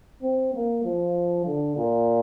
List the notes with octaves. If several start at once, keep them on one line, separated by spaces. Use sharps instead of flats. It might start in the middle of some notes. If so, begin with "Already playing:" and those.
C4
A#3
F3
D3
A#2